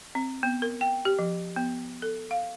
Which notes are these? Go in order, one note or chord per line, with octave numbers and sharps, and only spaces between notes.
C4
B3
A#4
G5
G4
F3
B3
A4
F5